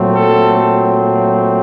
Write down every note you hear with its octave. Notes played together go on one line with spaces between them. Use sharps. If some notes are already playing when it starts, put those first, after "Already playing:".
Already playing: A#2 F#3 A3 C4
A4